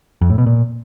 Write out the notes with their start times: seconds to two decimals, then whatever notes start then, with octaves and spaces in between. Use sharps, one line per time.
0.21 F2
0.30 A2
0.38 B2
0.46 A#2